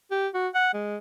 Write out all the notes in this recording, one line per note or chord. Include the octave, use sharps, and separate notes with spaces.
G4
F#4
F#5
G#3